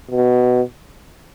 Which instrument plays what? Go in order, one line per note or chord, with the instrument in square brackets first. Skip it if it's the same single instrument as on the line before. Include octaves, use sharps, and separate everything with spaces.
[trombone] B2